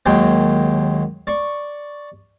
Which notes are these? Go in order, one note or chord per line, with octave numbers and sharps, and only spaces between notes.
D#2 F#3 G#3 G5
D5 C#6